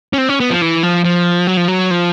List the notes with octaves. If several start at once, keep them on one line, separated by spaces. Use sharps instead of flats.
C#4
C4
C#4
B3
F3
E3
F3
F3
F#3
F3
F#3
F3